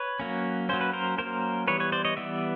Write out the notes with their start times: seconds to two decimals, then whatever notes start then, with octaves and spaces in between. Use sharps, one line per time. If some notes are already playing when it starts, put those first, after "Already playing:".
Already playing: B4 C#5
0.20 F#3 A#3 C#4
0.69 F#3 A#3 C#4 C5
0.81 B4
0.93 A#4 C5
1.18 F#3 A#3 C#4 A#4 C5
1.67 E3 G3 B3 B4 C#5
1.80 B4 C#5
1.92 C5 D5
2.05 C#5 D#5
2.17 E3 G3 B3 D5 E5